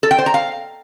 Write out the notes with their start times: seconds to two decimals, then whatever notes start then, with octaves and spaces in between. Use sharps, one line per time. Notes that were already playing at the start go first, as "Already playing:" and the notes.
0.03 A4
0.11 G5
0.18 C5
0.26 A#5
0.34 F5